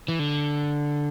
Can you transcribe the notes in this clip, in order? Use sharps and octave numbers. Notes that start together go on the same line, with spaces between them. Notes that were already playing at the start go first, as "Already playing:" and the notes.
E3
D3